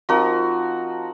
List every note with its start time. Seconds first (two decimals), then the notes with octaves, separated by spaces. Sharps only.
0.09 F3 C4 D#4 F#4 A#4